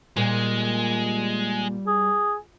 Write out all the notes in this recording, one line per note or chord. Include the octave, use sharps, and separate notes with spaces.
A#2 G3 G#3
G#4